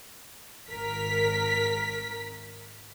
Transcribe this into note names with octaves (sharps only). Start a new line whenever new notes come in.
G#1 A#4 B6